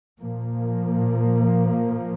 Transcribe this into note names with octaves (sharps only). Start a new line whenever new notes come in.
A#2 F3 A#3